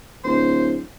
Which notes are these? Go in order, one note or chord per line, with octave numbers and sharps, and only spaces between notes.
D1 C5